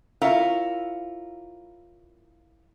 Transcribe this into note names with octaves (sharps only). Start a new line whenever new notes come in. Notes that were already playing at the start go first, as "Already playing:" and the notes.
E4 F4 A#4 C#5 F5